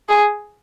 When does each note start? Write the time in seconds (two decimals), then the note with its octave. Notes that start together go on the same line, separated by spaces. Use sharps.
0.09 G#4